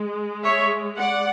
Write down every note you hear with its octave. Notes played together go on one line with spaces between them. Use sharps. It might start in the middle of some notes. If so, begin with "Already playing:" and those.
Already playing: G#3
C#5 E5
D5 F#5